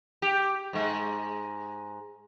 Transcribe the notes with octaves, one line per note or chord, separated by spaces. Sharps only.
G4
G#2 G#3